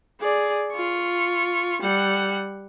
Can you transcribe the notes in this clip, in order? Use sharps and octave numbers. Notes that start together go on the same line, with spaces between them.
G#4 D5
F4 C#6
G3 F#5